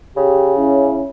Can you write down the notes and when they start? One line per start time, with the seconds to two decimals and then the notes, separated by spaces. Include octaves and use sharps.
0.17 C#3 G4
0.57 C#4 E4